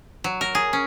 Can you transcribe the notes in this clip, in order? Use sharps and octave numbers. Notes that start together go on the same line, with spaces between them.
F#3
A#4
G#4
C#4